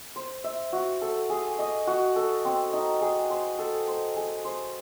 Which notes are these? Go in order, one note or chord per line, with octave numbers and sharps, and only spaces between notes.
C5
E5
F#4
A4
G#4
D#5
F#4
A4
C4
D#4
G#4
C5
A4
C5
G#4
C5